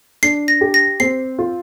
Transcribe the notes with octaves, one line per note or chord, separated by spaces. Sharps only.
D4 C7
A#6
G4
A#6
C4 C7
F4